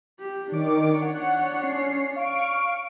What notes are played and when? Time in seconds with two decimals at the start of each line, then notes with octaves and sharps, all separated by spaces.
0.19 G4
0.52 D#3 D4 C#5 D6
1.02 F#5
1.63 C#4 C7
2.16 F5 C#6 D7